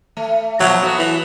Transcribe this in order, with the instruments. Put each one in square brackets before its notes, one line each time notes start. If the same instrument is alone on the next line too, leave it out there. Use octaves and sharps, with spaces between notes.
[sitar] A3
[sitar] A#2 F3 [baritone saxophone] F#3
[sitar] A3 B3 F#4
[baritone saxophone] E3